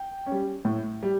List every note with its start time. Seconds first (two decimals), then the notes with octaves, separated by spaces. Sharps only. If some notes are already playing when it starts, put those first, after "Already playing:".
Already playing: G5
0.26 C#4
0.32 G3
0.65 A2
1.03 G3